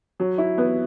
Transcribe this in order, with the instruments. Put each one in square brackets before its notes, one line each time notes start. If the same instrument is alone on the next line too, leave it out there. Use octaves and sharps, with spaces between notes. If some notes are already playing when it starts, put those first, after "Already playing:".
[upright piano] F#3
E4
B3